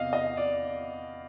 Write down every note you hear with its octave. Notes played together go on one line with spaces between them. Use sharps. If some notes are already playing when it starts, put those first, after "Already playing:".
Already playing: E2 C3 D#5 F5
D#5
D5